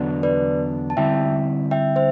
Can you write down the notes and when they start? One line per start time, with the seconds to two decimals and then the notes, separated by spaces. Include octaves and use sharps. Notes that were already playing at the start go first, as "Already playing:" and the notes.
Already playing: E2 D3 F#3 B3 D4
0.23 B4 D5
0.90 A5
0.97 D3 G3 C4 E4 E5 G5
1.71 E5 G5
1.96 C5 E5